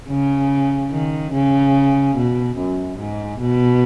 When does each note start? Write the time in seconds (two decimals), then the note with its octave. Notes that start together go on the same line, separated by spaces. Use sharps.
0.09 C#3
0.91 D#3
1.33 C#3
2.16 B2
2.57 F#2
2.99 G#2
3.40 B2